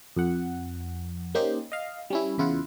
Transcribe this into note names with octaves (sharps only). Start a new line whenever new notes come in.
F2 F#5
A#3 C#4 D#4 G4 C5
D#5 F5
G3 C#4 E4
E2 C#3 E4 F4 F#5